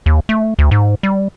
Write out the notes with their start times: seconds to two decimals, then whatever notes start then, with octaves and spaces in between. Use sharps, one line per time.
0.06 D#2
0.29 A3
0.59 D2
0.71 G#2
1.03 G3